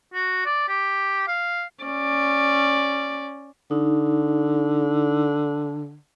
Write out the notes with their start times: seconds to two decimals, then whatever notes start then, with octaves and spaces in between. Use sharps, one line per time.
0.13 F#4
0.45 D5
0.68 G4
1.27 F5
1.84 C#4 D5
3.71 D3 D#4